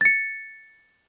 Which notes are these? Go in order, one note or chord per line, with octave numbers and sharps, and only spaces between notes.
A6 C#7